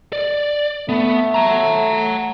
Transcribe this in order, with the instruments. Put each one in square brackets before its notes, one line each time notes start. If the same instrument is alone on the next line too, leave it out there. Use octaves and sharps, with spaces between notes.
[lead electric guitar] D5
[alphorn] A3 [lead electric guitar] B3
[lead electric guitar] F#5 A#5